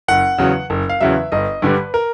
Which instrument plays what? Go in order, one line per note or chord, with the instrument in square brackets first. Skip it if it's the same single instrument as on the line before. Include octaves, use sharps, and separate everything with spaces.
[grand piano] F#1 F#5
E2 C#3 F#3
F#1
F5
E2 C#3 F#3 E5
G1 D#5
G2 D3 G3 B4
A#4